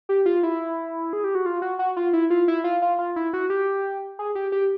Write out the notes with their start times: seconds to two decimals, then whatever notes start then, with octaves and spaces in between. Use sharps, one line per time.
0.09 G4
0.26 F4
0.43 E4
1.13 G#4
1.24 G4
1.35 F#4
1.46 F4
1.62 F#4
1.79 F#4
1.96 F4
2.13 E4
2.30 F4
2.48 E4
2.64 F4
2.82 F4
2.99 F4
3.16 E4
3.33 F#4
3.50 G4
4.19 G#4
4.35 G4
4.52 G4